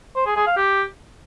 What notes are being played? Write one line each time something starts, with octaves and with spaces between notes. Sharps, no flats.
C5
G#4
G#4
F5
G4